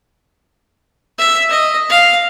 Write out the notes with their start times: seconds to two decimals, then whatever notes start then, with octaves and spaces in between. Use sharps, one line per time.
1.18 E5
1.50 D#5
1.90 F5